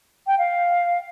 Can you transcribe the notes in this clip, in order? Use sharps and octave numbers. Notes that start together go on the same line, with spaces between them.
G5
F5